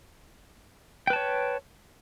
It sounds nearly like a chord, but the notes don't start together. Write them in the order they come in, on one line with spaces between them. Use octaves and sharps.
G5 B4 A5 C#5